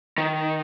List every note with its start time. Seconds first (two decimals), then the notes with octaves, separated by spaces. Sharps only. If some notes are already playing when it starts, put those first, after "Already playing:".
0.18 D#3